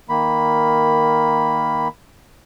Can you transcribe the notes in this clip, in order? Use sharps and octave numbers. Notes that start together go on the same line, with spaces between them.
D#3 A#3 B5